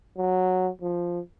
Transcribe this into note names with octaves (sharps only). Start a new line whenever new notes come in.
F#3
F3